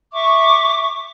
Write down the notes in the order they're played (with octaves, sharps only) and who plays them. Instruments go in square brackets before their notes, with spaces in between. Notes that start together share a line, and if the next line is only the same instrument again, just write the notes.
[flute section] E5 C#6 D6